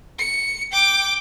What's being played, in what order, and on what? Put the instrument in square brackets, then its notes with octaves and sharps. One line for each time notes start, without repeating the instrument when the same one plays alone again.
[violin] C#7
G5 D6